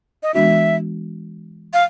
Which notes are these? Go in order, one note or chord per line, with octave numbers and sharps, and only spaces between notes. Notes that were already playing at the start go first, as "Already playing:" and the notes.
D#5
E3 G#3 B3 D4 F#4 E5
F5